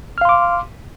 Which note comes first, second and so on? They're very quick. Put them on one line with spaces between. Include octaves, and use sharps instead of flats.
F6 F5 C6 D6